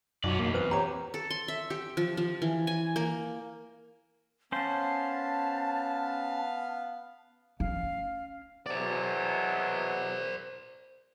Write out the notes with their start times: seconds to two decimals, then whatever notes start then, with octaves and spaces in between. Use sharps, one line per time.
0.24 B1 F#2 C#4 F#4 D5
0.39 E2 A#3
0.54 C4 B4 C5 D#6
0.71 G4 C#5 A#5 D6
1.14 A4
1.30 C6
1.48 E5
1.70 G4
1.97 F3
2.17 F3
2.42 E3
2.67 G#5
2.96 A#3
4.52 B3 C#4 C5 F5 A5
7.60 C#4 F5
8.66 E2 B2 F#3 C5 D5